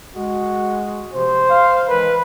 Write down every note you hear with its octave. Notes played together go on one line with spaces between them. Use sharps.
G#3 F#4
C3 F3 C5
F5
D#3 E3 G#3 B4